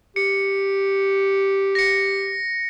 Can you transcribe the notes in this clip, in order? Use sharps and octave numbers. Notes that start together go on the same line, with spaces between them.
G4 C#7
A#6 C#7